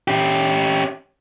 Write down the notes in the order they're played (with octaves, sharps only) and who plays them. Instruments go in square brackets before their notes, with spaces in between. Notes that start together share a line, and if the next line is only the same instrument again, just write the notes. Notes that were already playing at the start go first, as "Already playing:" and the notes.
[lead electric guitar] C#4 G4